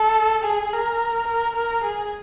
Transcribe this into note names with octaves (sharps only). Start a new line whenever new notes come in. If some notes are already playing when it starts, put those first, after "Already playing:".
Already playing: A4
G#4
A#4
A#4
A#4
G#4